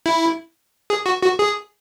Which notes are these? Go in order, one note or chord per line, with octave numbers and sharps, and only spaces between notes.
E4
G#4
F#4
F#4
G#4